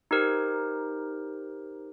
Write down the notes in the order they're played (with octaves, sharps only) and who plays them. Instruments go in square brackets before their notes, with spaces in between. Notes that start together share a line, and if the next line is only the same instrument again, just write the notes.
[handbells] D#4 G4 A#4 C5